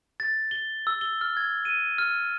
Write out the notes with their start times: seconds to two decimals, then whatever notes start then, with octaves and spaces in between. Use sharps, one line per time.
0.20 A6
0.51 G7
0.87 E6
1.01 G7
1.21 F6
1.37 G#6
1.65 D#7
1.98 F6